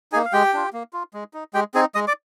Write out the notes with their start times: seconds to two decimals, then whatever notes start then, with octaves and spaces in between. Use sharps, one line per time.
0.12 A#3 D#4 G#4 G#5
0.25 F5
0.33 G#3 G4 G5
0.54 D4 F4
0.73 A#3
0.93 F4
1.14 G#3
1.34 D#4
1.54 G#3 G4 G5
1.74 C4 D#4 G#4 G#5
1.95 G#3 D#5 D#6
2.08 D5 D6